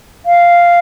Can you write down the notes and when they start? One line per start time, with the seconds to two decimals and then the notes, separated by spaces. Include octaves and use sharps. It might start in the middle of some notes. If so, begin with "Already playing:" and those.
0.26 F5